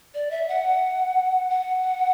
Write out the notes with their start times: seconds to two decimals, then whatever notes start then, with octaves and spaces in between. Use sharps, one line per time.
0.14 D5
0.31 E5
0.48 F#5
1.50 F#5